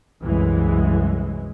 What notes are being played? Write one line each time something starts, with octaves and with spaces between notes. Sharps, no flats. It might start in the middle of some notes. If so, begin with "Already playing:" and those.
C2 F#2 E3 G#3